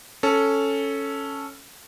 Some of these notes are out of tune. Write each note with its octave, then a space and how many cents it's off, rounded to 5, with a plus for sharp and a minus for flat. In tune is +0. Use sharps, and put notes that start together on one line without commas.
C#4 +0 A4 +0